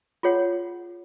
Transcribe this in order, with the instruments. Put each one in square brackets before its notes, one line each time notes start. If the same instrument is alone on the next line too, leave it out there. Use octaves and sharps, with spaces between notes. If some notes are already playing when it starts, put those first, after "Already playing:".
[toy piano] F4 G#4 C#5 F#5